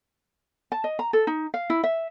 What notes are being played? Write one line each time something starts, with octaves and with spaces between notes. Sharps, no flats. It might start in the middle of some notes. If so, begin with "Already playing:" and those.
A5
D#5
A#5
A4
D#4
F5
E4
E5